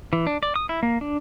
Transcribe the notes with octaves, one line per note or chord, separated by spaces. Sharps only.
E3
D4
D5
D#6
E4
A#3
D4